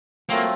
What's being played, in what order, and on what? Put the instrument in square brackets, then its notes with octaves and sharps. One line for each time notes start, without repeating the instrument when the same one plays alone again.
[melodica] F#3 A3 C4 F4 [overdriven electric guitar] A#3